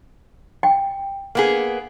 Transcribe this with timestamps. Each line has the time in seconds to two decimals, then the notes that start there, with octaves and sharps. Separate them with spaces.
0.63 G5
1.35 A#3 B3 G#4